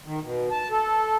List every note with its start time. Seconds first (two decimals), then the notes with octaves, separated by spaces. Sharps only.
0.05 D#3
0.22 B2
0.51 A5
0.70 A4